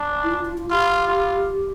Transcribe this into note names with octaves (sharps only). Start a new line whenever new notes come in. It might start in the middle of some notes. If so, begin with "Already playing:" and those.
Already playing: D4
E4
F4
F4
F4
F4 G4
F4